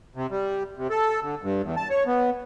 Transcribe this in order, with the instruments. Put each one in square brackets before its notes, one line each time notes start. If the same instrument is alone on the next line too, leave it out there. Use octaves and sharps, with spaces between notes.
[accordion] C3
G3
C3
A4
D3
G2
E2
A5
C#5
B3